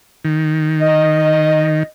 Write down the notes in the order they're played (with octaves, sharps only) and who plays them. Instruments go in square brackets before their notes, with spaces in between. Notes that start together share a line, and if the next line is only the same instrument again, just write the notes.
[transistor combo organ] D#3
[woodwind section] D#5